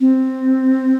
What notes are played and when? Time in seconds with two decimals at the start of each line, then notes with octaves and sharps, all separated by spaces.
0.01 C4